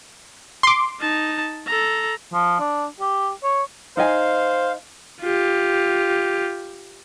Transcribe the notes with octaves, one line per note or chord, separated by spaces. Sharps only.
C6 D6
D#4 A5
A4 A#5
F3
D4
G4
C#5
D#4 C5 D#5 F5 G#5
F4 G4